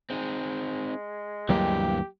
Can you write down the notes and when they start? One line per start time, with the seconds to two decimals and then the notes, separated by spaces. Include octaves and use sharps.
0.10 G#3 C4 D#4
1.49 D2 G2 E3 F#3 A#3 G4